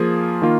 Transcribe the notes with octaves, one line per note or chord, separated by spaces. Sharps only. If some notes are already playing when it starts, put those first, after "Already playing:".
Already playing: F3 A#3 F4 G#4
D#3 A#3 F4